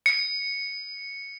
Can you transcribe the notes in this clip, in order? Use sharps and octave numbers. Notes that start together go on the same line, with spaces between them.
C#7